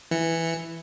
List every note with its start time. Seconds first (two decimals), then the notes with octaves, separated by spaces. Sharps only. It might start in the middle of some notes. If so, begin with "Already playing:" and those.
0.11 E3 C#7